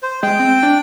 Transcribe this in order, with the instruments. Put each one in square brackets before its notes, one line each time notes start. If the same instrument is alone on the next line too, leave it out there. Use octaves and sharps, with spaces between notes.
[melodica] C5
[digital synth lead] G#3 [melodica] G5
[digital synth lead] C4
D4